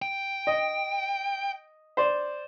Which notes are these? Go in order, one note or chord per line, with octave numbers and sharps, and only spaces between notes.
G5
D#5
C5 D5